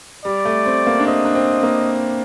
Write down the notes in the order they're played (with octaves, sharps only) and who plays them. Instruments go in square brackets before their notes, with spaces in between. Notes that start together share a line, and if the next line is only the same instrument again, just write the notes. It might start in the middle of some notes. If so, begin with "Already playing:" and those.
[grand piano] G3 [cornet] D5
[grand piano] A3
C4
A#3
D4
[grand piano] C4 [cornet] D#5
[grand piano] D4
C4
A#3